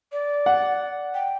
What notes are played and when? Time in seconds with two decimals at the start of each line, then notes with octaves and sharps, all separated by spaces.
0.12 D5
0.46 F#5
1.14 G5